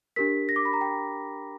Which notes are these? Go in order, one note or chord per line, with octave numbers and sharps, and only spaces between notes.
D4 G4 A#4 B6
A#6
D6
B5
A#5
G5